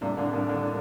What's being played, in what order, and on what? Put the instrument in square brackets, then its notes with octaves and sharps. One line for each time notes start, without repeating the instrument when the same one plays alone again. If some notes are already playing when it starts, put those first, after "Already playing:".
[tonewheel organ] A2 G3 A#3 D4 [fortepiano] C3
[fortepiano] D3
D#3
D3